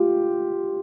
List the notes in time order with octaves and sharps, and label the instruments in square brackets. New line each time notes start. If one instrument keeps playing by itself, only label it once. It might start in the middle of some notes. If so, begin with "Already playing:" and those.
Already playing: [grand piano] F4 G4